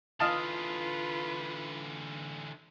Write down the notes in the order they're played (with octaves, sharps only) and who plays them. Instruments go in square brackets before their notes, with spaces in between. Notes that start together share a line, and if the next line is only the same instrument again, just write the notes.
[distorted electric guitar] D3 E3 [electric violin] F4 B4 [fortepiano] D#5 F5 A5